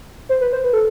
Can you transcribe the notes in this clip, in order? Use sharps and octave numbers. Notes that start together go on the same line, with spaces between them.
C5
B4
C5
B4
A4